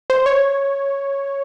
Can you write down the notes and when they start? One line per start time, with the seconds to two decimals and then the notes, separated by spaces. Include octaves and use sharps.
0.10 C5
0.26 C#5